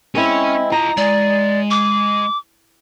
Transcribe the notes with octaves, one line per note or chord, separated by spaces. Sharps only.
G#3 C4 C#4 E4
F4 D#5 A#5
G#3 D5
D6